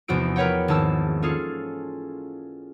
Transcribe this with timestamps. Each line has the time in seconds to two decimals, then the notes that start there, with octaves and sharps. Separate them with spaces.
0.08 F1 E2 F3 F#4 E6 D7
0.36 A#4 B4 C#5 F#5 G5
0.68 G#1 A#3 A5 E6
1.22 C#4 F4 G#4 A4